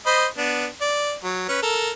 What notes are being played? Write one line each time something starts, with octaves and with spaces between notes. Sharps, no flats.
C5 D#5 B5
B3 D4
D5
F#3
C#4 B4
A4 A#4